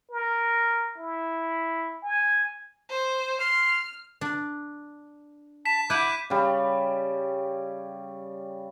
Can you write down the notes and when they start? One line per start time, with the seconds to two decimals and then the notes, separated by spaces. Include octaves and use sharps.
0.11 A#4
0.98 E4
2.04 G#5
2.89 C5
3.41 C6 F6
4.21 D4
5.65 A5 B6 E7
5.90 E4 F#5 D6 F#6 G6 D#7
6.30 C#3 G3